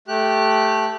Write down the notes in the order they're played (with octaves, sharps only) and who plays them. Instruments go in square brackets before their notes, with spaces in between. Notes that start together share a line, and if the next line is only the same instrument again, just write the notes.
[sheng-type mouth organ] A3 G4 F#6